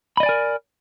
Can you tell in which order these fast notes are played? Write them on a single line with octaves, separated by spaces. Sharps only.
B5 D#5 D5 G#5 A#4